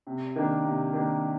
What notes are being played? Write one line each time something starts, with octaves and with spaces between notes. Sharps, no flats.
C3
D#3 A#3 D4
C3
D#3 A#3 D4